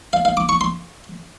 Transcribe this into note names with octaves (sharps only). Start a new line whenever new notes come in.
F5
F5
D6
C#6
C6